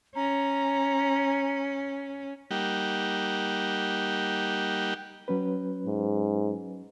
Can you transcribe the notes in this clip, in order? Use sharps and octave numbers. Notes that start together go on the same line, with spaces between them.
C#4 A#5
G3 A#3 D#4 G4 F#5
F#3 C#4 B4
G#2